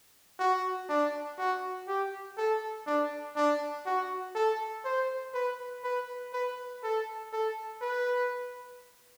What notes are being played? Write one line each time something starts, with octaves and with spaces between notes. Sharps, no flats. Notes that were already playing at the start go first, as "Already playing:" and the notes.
F#4
D4
F#4
G4
A4
D4
D4
F#4
A4
C5
B4
B4
B4
A4
A4
B4